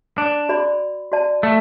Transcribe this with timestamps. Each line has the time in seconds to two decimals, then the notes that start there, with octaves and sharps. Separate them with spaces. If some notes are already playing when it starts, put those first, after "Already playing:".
0.18 D4
0.49 F#4 D5 B5
1.12 F#4 D5 A5
1.43 A3